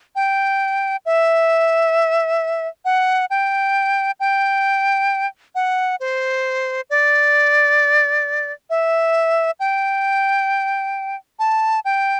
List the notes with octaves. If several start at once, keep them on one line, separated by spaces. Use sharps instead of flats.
G5
E5
F#5
G5
G5
F#5
C5
D5
E5
G5
A5
G5